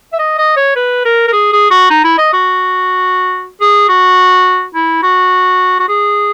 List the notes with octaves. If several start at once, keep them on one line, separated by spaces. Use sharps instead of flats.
E5
D#5
D#5
C#5
B4
A#4
A#4
G#4
G#4
F#4
D#4
E4
D#5
F#4
G#4
F#4
E4
F#4
F#4
G#4